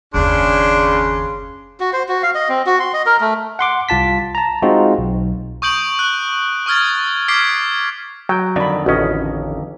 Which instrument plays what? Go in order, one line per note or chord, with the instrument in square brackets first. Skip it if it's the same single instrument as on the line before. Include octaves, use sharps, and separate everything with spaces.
[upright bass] F#1 D#2 [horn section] C#3 C6 [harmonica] D4
[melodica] F#4
C5
F#4
F5
D#5
C4
F#4
C6
D#5
A#4
A3
[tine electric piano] F#5 C6 D6
C2 F4 A5 B6
A5 A#5
G#3 C4 D#4 F4 F#4
B1
[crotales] C#6 D#6 G6 D7 F#7
F#6
C#6 D#6 F6 G#6 A6
D6 F6 G#6 B6 C7 D7
[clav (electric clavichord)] F#3 [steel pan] G5
[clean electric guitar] F2 D3 D#3 [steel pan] D5 B5
[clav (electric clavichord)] A1 C#4 [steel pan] F#4 D#5